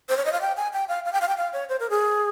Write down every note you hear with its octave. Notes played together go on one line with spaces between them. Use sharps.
C5
C#5
D#5
F5
G5
G#5
G5
F5
F5
G5
F5
G5
F5
C#5
C5
A#4
G#4